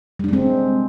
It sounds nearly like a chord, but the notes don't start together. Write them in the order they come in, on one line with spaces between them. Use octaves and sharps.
G3 D4 G#3 C4